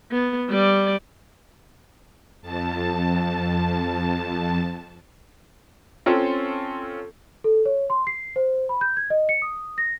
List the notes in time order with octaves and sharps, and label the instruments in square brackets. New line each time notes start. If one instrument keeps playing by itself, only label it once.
[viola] B3
G3 D5
[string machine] F2 A5
[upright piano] C4 C#4 F4 A4
[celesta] A4
C#5
C6
C7
C5
B5
G6
G#6
D#5
C#7
D#6
A#6